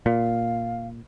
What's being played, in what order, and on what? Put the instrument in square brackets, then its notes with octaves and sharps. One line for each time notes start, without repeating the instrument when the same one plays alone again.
[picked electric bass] A#2 [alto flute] F5